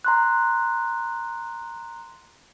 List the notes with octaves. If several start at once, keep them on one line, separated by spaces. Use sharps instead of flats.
A#5 C6 F#6